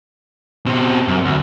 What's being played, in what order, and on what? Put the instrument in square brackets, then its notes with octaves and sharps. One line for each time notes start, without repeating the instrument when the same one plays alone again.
[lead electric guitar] B2 C4
F#2
D2